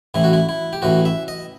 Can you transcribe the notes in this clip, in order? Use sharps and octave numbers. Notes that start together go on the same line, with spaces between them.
A1 A2 E3 E4
F#4
E4
E4
G4
A1 A2 E3 F#4
E5
D#5